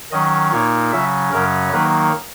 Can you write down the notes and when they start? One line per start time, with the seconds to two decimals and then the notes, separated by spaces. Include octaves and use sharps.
0.11 D#3 F#3 C#4 D#5
0.52 A#2 A#3 D#4 C#5
0.92 C#3 F#3 C#4 E5
1.32 F#2 C#3 F#3 C#4 A#4
1.72 D#3 F#3 A#3 D#4 B4